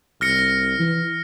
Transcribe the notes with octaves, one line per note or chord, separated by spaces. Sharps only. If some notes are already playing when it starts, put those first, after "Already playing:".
C2 F6 A#6 C#7
E3